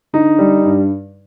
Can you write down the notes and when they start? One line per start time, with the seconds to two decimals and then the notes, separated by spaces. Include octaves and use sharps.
0.13 D3 D#4
0.39 G3
0.65 G2